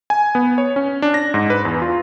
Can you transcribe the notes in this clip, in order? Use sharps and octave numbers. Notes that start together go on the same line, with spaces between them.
G#5
B3
C#5
C#4
D4
A#6
G#2
B4
E2
F4